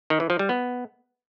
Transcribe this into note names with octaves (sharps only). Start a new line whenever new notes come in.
D#3
E3
F3
G3
B3